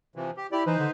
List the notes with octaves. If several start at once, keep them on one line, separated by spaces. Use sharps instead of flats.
C3 E3 F3
G4
E4 G4 D5
E3 D#4 B4 C5
D3